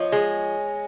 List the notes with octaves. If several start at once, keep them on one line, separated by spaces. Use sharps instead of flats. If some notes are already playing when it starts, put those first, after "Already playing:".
Already playing: F3 C#5 D#5
G#3